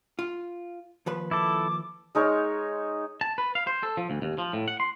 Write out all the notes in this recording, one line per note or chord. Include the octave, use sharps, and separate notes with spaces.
F4
D#2 F3 B4
E4 A4 D6
G#3 D#4 A#4 C#5
A5
B4
F5
C5
A4
F3
D2
D#2
F3
A2
F#5
C6